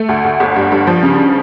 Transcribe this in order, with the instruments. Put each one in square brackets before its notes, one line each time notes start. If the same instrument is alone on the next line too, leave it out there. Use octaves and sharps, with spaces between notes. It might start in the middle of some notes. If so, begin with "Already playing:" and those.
Already playing: [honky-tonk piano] A3
D2
D2
G1
G2
G2
F3
C#3